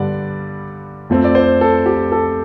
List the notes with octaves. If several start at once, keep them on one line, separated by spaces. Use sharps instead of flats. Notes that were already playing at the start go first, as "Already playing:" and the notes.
Already playing: G2 D3 G3 D5
F2 F3 A3 C4
D5
C5
A4
G4
A4